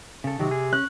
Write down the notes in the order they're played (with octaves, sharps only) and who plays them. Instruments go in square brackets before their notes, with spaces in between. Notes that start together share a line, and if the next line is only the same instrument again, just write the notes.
[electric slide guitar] C#3 A4
[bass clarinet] C3 [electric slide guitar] D#3 F#3
[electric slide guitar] G#4
[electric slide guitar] C#4 [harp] F#6